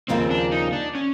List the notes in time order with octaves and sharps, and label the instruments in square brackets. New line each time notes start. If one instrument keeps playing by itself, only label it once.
[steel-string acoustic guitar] D#2 C#3 F3 A#3 [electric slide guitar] C4
[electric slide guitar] D4
D#4
D4
C#4